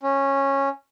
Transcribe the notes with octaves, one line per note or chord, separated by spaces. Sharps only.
C#4